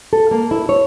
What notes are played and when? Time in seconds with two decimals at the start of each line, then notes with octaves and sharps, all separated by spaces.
0.13 A4
0.31 A#3
0.51 E4
0.69 C#5